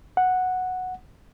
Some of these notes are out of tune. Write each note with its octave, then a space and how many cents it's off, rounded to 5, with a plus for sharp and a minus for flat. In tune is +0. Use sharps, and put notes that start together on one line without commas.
F#5 -5